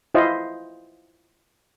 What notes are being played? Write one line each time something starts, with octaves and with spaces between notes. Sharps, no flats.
E4 F4 C5 D#5